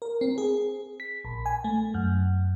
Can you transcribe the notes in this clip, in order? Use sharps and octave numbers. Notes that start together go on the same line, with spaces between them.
A#4
C4
G#4
B6
A#1
G#5
A3
F#2